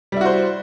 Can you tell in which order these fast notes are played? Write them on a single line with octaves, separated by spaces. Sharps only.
G3 E4 F#4 C5